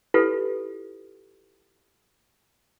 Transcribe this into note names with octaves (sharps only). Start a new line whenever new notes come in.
E4 F4 G4 A4 B4